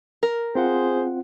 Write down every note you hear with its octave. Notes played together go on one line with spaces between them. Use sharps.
A#4
C4 F4 G#4 C5 F#5